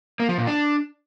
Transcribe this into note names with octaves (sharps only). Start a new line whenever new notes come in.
A#3
F3
A#2
D4